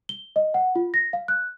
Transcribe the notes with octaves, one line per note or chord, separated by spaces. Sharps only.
G7
D#5
F#5
F4
A#6
F5
F#6